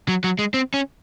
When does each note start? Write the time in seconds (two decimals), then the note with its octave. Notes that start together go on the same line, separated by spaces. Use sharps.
0.08 F#3
0.24 F#3
0.39 G#3
0.54 C4
0.74 C#4